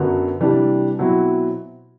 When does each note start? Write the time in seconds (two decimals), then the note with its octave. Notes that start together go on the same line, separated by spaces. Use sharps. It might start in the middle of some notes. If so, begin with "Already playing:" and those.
Already playing: F#2 D3 F#3 B3
0.40 C3 E3 G3 D4
0.99 B2 F#3 C4 E4